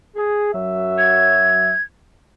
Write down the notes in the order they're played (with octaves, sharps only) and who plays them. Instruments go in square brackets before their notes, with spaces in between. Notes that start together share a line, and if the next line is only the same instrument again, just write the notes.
[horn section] G#4
F#2 F#3 E5
[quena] G#6